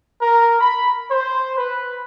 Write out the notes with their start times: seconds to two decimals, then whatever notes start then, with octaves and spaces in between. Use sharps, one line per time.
0.20 A#4
0.61 B5
1.09 C5
1.57 B4